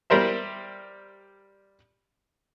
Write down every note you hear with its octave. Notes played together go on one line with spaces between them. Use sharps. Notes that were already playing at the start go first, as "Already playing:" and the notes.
G3 A#4 C5 E5